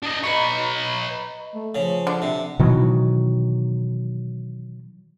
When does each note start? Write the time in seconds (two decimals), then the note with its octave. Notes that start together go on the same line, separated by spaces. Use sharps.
0.03 D4 D#5
0.24 B4 C#5 D#5 A#5 B5
1.54 A3
1.75 C#3 F3
2.07 D3
2.22 C3
2.59 B2 D#3 E3 F#3